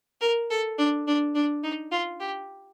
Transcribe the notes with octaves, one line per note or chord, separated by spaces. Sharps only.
A#4
A4
D4
D4
D4
D#4
F4
G4